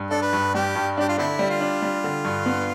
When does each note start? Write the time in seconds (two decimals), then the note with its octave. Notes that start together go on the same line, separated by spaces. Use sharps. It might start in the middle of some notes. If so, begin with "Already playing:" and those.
Already playing: G2
0.10 D4 A4
0.22 B4
0.33 G2
0.54 G3 G4
0.75 G2
0.97 D4 G4
1.09 F4
1.18 D3 A3 C4 E4
1.39 G3
1.50 F4
1.61 D4
1.82 G3
2.04 D3
2.25 G2
2.46 B3